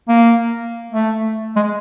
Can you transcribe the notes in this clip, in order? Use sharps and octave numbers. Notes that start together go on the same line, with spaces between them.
A#3
A3
G#3